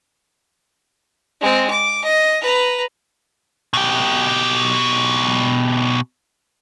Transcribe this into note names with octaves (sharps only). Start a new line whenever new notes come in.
G#3 C4
D6
D#5
B4 A#5
B2 G4